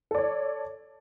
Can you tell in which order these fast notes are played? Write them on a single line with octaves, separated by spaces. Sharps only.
A4 D5 C#5